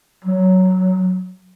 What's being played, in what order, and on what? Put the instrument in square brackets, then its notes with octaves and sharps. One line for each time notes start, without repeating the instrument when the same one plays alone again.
[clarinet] F#3